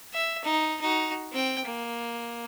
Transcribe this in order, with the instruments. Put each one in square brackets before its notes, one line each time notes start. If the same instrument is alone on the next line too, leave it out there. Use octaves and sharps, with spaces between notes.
[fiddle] E5
D#4
D#4 F#4
C4 G5
A#3